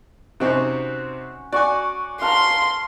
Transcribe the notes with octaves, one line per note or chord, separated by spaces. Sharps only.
C3 C4 C#4 D#4 F#4 F#5
F#4 D5 G#5 C#6
F5 A5 A#5 C6